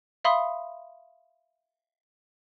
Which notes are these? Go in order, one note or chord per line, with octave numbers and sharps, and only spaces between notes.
E5 F5 B5 C6 D#6